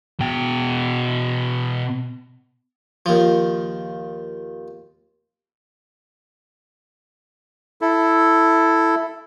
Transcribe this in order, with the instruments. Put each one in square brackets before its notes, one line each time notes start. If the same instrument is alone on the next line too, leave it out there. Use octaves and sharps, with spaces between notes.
[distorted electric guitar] B2 G5
[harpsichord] D#2 F3
[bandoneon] E4 A4